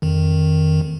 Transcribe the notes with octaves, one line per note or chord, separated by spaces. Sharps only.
F2 D#3